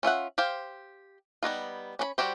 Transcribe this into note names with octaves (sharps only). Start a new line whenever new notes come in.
C#4 F4 E5 F#5
G4 C5 F5
G3 B3 D#4 F4
C#4 D4 B5
G3 F#4 G4 C5